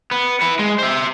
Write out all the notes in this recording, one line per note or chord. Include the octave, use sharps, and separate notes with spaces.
B3
E4 B4
G#3
C5 E5